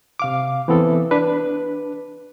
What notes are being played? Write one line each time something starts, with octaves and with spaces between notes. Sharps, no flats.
C3 F5 D6
E3 B3 C4 A4
D4 B4